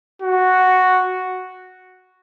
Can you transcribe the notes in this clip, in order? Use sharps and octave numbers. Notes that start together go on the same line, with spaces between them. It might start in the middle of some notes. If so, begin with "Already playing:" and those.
F#4